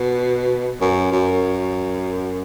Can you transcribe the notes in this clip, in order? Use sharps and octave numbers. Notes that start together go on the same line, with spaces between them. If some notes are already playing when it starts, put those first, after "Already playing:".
Already playing: B2
F#2
F#2